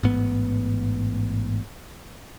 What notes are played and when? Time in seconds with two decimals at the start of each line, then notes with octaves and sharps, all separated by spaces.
0.03 A1 G#2 B3